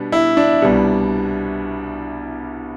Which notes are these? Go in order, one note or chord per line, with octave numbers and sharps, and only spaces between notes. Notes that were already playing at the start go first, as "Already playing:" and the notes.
Already playing: B2 G3 B3 D4
E4
D4
C2 B2 G3 B3